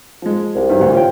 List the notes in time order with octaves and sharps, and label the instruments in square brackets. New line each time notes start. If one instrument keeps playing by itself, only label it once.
[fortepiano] F3 G#3
[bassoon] C2
[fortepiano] G2 E3 F#3
D2
F4 C#5 G5